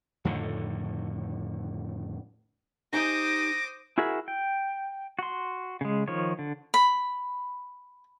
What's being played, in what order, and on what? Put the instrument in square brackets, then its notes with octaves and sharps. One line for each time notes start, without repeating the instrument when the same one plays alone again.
[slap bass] F2 A2 D3 D#3
[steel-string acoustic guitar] D#4 G4 G#5 [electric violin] C5 D#6 [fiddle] D6 [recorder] A#6
[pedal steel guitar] E4 F#4 G#4 A#4 E5
G5
F#4 C6
C#3 G#3
D#3 F3 C#5
D3
[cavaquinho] B5